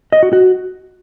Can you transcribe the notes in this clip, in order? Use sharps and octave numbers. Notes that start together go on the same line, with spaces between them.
D#5
F#4
F#4